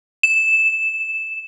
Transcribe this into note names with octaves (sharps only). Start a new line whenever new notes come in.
E7